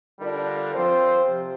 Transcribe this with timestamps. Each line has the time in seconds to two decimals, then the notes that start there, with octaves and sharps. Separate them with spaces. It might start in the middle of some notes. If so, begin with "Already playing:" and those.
0.19 D3 G3 D4 F4 A#4
0.73 F3 C4 F4 C5
1.25 C3